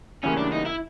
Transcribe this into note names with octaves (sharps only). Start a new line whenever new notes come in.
D2 C#3 E3 G3 A#3 C#4
D4
D#4
E4